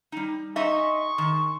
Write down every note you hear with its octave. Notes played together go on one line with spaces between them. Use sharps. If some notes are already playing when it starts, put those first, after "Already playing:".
G3 D#4
D#4 G#4 D#5 E5 C6 C#6
D#3